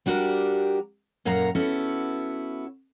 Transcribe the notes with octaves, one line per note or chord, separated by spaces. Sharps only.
G3 D4 F#4 G4 A#4
F#2 A#2 A#4 F5 F#5 A#5
B3 C#4 E4 F#4 A4